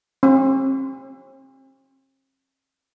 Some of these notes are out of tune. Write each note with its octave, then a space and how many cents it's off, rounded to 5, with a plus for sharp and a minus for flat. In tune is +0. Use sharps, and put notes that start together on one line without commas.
C4 +45